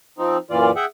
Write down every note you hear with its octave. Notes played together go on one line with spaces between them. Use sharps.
F3 C4 D#4
F#2 A#2 E3 F4 D5
G#4 E5 F#5 G5